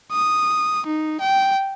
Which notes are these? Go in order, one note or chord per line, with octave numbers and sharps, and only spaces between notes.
D#6
D#4
G5